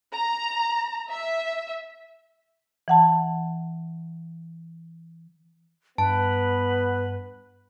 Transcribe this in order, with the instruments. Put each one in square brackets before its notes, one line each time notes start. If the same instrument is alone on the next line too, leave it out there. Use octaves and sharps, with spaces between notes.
[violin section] A#5
E5
[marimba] E3 F#5 A5
[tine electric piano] G2 [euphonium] B3 [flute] B4 [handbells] A5